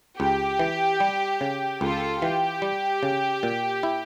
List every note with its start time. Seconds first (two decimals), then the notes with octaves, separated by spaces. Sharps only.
0.20 C#2 G4
0.59 E3
1.00 G3
1.41 C#3
1.81 C#2 F4 A4
2.22 E3 G4
2.62 G3
3.03 C#3
3.43 A#2
3.83 E4